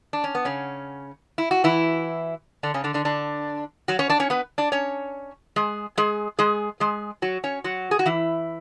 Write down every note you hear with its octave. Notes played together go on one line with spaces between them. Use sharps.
D4
C#4
B3
C#3 C#4
E4
F#4
E3 E4
D3 D4
C#3 C#4
D3 D4
D3 D4
D3 D4
F#3 F#4
C#4 C#5
D4 D5
C#4 C#5
B3 B4
D4 D5
C#4 C#5
G#3 G#4
G#3 G#4
G#3 G#4
G#3 G#4
F#3 F#4
C#4 C#5
F#3 F#4
G#4
F#4
E3 E4